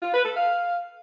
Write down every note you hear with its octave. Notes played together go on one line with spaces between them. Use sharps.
F4
B4
A4
F5